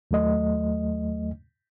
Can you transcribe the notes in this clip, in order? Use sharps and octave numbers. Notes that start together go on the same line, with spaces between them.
D#2 F#3 A3 D#5